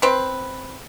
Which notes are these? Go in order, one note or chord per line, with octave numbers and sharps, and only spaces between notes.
C4 B4